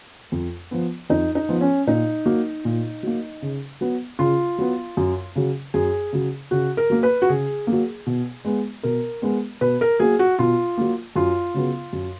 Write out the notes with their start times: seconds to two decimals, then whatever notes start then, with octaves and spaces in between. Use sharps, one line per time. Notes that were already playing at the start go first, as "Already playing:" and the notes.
0.32 F2
0.71 F3 B3
1.10 F2 D#4
1.35 D#4
1.49 F3 B3
1.61 C#4
1.87 A#2 D#4
2.26 F#3 A#3
2.65 A#2
3.03 F#3 A#3
3.42 C#3
3.81 F#3 B3
4.19 C#3 F4
4.58 F#3 B3
4.97 F#2
5.36 C#3 F#3
5.74 F#2 G#4
6.13 C#3 F#3
6.51 C#3 F#4
6.77 A#4
6.90 F#3 A#3
7.03 B4
7.22 F#4
7.29 C#3 G#4
7.67 A#3
7.72 F#3
8.07 B2
8.45 G#3 B3
8.83 B2 A#4
9.22 G#3 B3
9.61 B2 B4
9.81 A#4
10.00 F#3 A#3 G#4
10.19 F#4
10.39 B2 F4
10.77 F#3 A#3
11.16 F#2 F4
11.54 C#3 F#3 B3
11.93 F#2